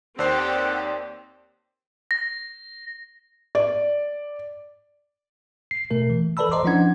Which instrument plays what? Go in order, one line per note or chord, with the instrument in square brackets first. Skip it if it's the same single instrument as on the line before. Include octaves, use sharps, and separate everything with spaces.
[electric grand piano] D#2 C5 C7 [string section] C4 G4 [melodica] A4 F#5 [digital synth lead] D5
[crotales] A#6
[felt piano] D5
[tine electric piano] C7
B2 A3 A#4
E3
A4 B4 D5 A5 B5 E6
C5 D#5 A#5 C6 D6
F3 C#4 D4 E4 F#5 G#6